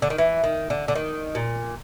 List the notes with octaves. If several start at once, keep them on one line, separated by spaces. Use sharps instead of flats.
D3
D#3
E3
D#3
D3
D3
D#3
A#2